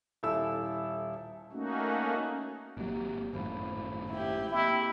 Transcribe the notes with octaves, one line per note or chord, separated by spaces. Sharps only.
D#1 E4 A4 E6
A3 A#3 C#4 D#4 F#4
G#1 F#3 A#3 G4
G#1 F#2 A2 C5 F5 B5
E4 G4
A#3 C4 E4 G4 D#5